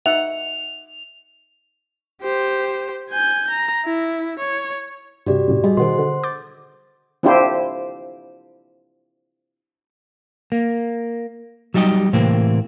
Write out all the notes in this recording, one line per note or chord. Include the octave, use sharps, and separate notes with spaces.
D#4 E5 F#5 F7
G4 C5
G#5 G6
A#5
E4
C#5
G2 C3 F#4 G4 D5
F#2 A2 C3
G3 F#4 G#4 D#5
B2 D#3 C5 F#5 C6
D3
D6 G6 A6
C4 D4 E4 F4 G4 C5
A#3
F#3 G3 D#4 G4 D#5
A2 C3 E3 A#3 C4